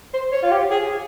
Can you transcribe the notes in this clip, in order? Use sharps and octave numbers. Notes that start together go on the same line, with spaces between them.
C5
C#5
F4
G4
G#4